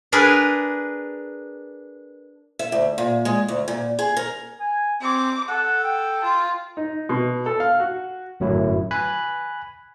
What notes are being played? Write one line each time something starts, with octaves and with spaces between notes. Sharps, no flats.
D4 G#4 A#4 B4
E5
D2
A#2
G#3
D2
A#2
G#4
A#4
G#5
C4 D6
A4 F#5
G5
F4
D#4
B2
A4
F5
F#4
G1 F#2 A2 F#3 E4
G#5 B5 F#6